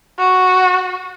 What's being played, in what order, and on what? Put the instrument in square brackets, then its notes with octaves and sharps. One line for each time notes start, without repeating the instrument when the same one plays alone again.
[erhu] F#4